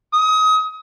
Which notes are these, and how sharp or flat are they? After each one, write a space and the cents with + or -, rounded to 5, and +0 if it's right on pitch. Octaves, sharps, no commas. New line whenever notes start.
D#6 +30